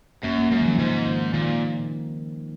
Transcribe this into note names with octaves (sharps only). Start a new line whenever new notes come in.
F#2 A#3
A#3
F#2 G#3
D#3
F3
G#2 C#3
D#3
A#2 D#3